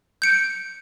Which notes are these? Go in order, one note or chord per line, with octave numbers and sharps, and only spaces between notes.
G6 C#7 D7